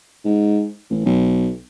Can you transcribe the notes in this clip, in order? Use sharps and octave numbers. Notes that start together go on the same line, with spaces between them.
G#2
A1
B1